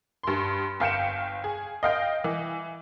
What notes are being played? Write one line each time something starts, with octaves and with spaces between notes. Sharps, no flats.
G2 C6
G1 F5 G5 C#7 E7
G#4
D#5 F5 G5
E3